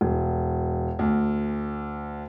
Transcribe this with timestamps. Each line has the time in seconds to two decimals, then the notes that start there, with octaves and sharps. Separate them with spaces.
0.01 E1
0.99 D2